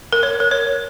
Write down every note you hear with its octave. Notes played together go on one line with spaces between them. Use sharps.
A#4
C#5
A#4
C#5